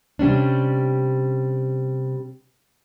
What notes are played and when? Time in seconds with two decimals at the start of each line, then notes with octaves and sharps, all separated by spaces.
0.19 C3 G3 C#4 D4